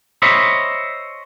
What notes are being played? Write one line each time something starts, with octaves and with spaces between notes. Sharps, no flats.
C5 C#5 D#5 E5 B5